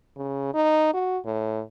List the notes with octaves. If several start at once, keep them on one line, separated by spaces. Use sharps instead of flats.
C#3
D#4
F#4
A2